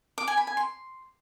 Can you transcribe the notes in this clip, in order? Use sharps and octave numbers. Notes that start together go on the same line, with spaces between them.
D6
G#5
B5
G#5
C6